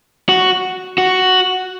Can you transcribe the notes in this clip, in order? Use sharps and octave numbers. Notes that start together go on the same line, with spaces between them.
F#4
F#4